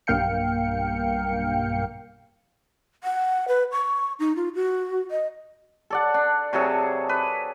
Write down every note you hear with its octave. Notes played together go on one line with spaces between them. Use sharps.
B1 G2 A#3 F5 G5 C#7
F#5
B4
C#6
D#4
F4
F#4
D#5
A4 D5 F#5
D4
C3 F#3 G#4 A4
B4